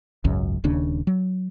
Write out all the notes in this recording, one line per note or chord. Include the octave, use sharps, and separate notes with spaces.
G#1 C#2 F#2
D#1 D#2 C#3 D4
F#3